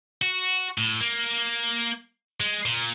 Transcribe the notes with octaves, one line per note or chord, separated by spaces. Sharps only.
F#4
A2
A#3
G#3
A#2